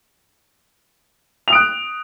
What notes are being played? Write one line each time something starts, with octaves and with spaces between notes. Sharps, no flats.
D#6 F#6 D7 F7